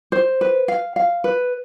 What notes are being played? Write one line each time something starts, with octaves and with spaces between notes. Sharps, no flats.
C5
B4
F5
F5
B4